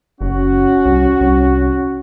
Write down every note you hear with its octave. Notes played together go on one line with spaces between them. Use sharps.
F#1 C#4 F#4
C2
C2